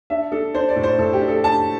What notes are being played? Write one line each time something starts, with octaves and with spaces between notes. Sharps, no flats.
D4 E5
D4 A4
D4 C5
D5
A2
C5
A2 A4
G4
D4
A4
D4 A5